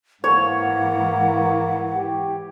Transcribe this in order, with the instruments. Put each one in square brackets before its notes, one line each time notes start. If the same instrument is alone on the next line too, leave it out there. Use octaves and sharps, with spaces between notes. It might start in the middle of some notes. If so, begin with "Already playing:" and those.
[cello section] G#2 E3 [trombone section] A#3 [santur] C#5 [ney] F#5
[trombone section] G4